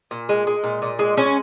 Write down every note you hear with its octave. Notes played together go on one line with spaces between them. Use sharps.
A#2
G#3
G#3
A#2
A#2
G#3
G#3 C#4